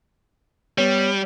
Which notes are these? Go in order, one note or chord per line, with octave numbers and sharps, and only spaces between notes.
G3 B3 C#5